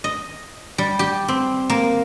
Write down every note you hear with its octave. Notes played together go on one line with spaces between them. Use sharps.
D#5
G3
G4
C4
A#3